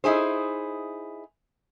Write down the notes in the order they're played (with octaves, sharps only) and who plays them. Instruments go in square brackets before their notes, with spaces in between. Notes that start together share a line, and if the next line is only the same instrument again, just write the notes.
[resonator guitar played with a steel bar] D#4 E4 G#4 C5